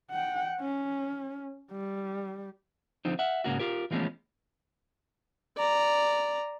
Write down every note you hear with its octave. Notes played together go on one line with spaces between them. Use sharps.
F#5 G5
C#4
G3
D3 F3 C4 D#4
E5 F#5
G#2 C#3 A#3 F#4
F4 G4 A#4
E3 F3 G#3 A3 B3 C#4
D5 A#5